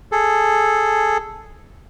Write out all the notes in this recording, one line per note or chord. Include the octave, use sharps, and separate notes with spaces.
G#4 A4